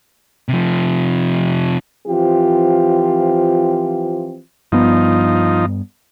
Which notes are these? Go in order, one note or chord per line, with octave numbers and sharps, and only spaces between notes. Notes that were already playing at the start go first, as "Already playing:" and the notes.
C3 F3
E3 F3 C4 F4 G4
G2 F3 B3 D#4